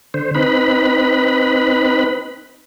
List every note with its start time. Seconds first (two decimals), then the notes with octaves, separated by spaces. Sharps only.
0.14 D3 C5
0.35 C4 D#4 B4 B5